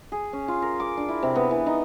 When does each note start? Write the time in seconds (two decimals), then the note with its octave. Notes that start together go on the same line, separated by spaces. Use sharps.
0.12 G#4
0.33 C#4
0.48 F4
0.62 A#4
0.80 D6
0.97 D4
1.09 E4
1.23 C3
1.35 B3
1.51 E3
1.66 D#4